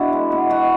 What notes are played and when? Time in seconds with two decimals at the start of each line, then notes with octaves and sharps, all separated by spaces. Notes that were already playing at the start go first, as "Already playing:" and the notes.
Already playing: B2 D4 E4 F#4
0.13 G#3
0.32 B3
0.50 B2 F#4